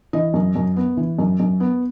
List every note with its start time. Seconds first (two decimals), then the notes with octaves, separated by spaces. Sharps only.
0.13 E3 D#5
0.34 F#2
0.56 F#2
0.76 B3
0.97 E3
1.19 F#2
1.40 F#2
1.60 B3